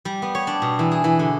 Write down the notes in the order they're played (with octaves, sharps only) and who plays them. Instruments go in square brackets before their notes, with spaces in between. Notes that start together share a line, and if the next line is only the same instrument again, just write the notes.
[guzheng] G3
B3
C#5
D4
B2
E3
G#4
E3
D3